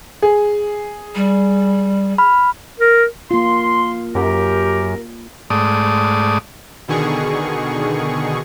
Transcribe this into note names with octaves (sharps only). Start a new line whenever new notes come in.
G#4
G3
B5 F6
A#4
A#3 F4 C6
F#2 G4 A#4
G#2 A3 D5 D#6
B2 D3 D#3 G#4 C#6